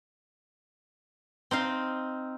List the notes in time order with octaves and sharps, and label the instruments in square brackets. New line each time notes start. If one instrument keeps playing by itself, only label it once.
[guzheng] C4 D#4 F5